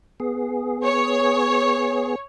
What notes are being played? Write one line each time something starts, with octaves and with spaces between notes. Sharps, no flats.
B3 G#4
C#5